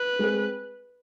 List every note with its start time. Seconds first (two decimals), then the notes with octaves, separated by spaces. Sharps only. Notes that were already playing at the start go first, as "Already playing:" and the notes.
Already playing: B4
0.19 G#3 C4 G#4